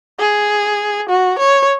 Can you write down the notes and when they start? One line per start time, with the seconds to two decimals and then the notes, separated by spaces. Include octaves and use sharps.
0.19 G#4
1.09 F#4
1.39 C#5